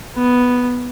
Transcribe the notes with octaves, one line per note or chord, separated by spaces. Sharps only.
B3